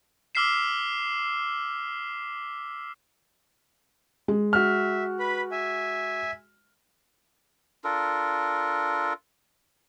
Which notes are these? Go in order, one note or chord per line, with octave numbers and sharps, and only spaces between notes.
D6 E6 F6 B6 C7 E7
G#3
F#4 E5 F6
B4 B5
E5 G#5
D4 F4 A4 A#4